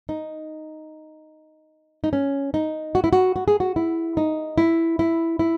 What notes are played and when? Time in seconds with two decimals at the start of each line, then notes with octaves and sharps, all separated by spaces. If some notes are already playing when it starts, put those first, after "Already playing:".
0.09 D#4
2.04 D#4
2.13 C#4
2.54 D#4
2.95 F#4
3.04 E4
3.13 F#4
3.36 F#4
3.48 G#4
3.60 F#4
3.76 E4
4.17 D#4
4.58 E4
4.99 E4
5.39 E4